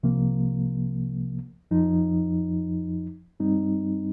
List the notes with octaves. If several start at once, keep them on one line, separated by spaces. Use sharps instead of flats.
C2 C3 F3 A#3
F2 F3 D#4
G2 G3 C4 D#4